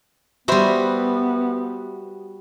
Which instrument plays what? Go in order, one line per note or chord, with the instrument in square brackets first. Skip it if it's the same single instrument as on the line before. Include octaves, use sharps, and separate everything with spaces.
[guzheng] G3 F#4 [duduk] B3 [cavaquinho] B4 C5 E5